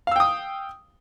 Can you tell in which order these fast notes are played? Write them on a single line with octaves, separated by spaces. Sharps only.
F5 E6 G5 D#6